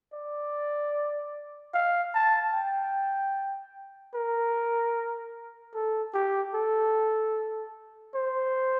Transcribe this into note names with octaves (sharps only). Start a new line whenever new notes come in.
D5
F5
A5
G5
A#4
A4
G4
A4
C5